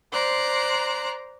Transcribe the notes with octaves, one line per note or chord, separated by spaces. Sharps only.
C5 D5 A#5 F#6